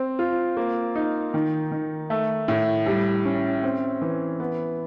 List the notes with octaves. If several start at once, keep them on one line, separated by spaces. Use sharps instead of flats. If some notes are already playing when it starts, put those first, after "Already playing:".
Already playing: C4
F4
A#3
D#4
D#3
D#3
A3
A2
G3
C#4
C4
E3
B3